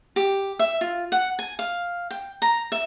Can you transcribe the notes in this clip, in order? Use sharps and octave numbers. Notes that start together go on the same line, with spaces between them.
G4
E5
F4
F#5
G#5
F5
G5
A#5
E5